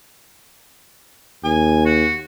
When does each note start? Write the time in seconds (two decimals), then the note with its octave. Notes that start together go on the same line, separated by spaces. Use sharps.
1.44 D#2 G#5
1.85 F#4